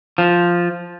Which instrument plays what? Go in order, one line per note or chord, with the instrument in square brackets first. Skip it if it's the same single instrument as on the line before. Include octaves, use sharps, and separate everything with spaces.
[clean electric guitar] F3